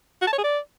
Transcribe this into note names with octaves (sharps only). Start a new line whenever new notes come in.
F#4
A5
C#5
G#4
D5